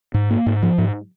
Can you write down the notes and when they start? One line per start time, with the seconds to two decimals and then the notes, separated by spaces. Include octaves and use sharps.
0.14 G#2
0.30 A#3
0.46 G#2
0.63 F3
0.78 G#2